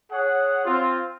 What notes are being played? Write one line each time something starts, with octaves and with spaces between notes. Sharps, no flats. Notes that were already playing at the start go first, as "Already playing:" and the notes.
G#4 C#5 F#5
C4 F4